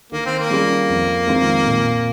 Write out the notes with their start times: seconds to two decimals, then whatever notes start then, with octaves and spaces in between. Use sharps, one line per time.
0.12 D#3 A#3
0.26 C4
0.39 A#3
0.50 G3 C#4 F4 G#4
0.89 F2
1.27 D#3 G#3 C4 F4
1.66 A#2